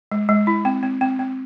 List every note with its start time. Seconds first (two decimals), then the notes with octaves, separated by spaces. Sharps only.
0.11 G#3
0.29 G#3
0.47 E4
0.65 C4
0.83 C4
1.01 C4
1.19 C4